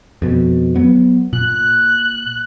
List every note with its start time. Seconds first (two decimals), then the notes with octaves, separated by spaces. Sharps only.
0.22 F2 B2
0.76 F#3 B3
1.33 A#2 F#6